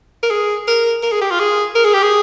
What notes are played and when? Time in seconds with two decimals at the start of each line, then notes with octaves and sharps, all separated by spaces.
0.23 A#4
0.30 G#4
0.68 A#4
1.03 A#4
1.12 G#4
1.21 G4
1.31 F4
1.40 G#4
1.75 A#4
1.85 G#4
1.94 G4
2.03 G#4